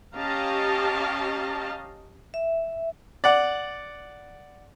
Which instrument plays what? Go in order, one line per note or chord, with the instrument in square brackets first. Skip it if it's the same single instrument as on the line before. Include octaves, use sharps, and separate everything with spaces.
[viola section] C#4 G4 D#5 F5 A5 A#5
[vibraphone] E5
[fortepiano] D5 F#5